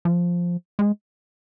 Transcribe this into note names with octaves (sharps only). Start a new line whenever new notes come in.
F3
G#3